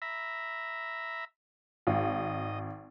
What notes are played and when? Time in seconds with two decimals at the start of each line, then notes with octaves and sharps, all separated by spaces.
0.02 E5 A#5 B5
1.87 G#1 D#5